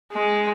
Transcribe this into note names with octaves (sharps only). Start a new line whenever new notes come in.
G#3